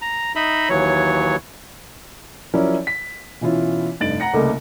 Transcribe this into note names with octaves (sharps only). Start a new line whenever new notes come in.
A#5
D#4 D#5 E5 B5
D#2 E3 F#3 C#5
F3 F#3 C#4 E4 A#4 D5
B6
B2 E3 C#4 E4 F4
F1 G2 D#4 A6 D7 F#7
F#5 A#5 A#6 C#7
C2 C#3 A3 A#3 D#5 D6